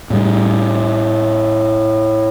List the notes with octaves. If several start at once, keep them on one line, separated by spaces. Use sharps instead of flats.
A2 G3